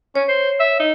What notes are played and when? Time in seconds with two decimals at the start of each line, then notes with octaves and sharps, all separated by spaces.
0.16 C#4 C#5
0.28 C5
0.60 E5
0.80 D#4